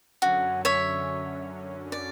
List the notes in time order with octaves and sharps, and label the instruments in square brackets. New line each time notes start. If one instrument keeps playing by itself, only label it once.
[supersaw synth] F#2 D3 F#3 C#4 [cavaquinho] F#4
[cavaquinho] C#5 E5
D5